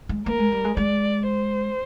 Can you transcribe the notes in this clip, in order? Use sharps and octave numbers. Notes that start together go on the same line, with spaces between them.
G#3
A#3 A#4
G#3
G3
G#3
G#3 D5
C5